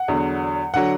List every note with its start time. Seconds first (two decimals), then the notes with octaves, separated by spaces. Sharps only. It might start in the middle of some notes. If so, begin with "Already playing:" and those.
Already playing: F#5
0.08 E2 D3 F#3
0.74 D3 F#3 F#5